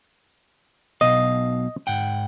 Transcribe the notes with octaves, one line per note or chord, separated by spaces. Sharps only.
B1 B2 D#5 F5
G#2 F#5 G5